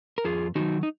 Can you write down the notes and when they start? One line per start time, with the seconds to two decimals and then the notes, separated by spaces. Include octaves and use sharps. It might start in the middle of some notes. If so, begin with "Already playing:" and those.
0.18 A#4
0.24 F2 F4 G#4
0.55 D#3 F#3 D#4 F#4
0.83 D#4